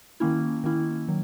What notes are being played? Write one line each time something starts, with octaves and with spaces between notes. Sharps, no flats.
D#3 A#3 C#4 E4
D#3 A#3 C#4 E4
D#3 F#3